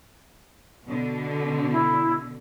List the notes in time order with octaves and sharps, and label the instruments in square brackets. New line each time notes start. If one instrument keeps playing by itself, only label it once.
[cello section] B2 D3
[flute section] E4